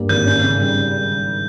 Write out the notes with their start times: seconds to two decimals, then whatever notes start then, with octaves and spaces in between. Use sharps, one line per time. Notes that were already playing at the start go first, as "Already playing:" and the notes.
Already playing: G2 G3 A#3
0.09 G#1 G6
0.27 C#4
0.43 C#3
0.59 G3
0.76 C#3